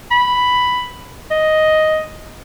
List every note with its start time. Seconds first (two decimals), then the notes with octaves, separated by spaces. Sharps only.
0.11 B5
1.31 D#5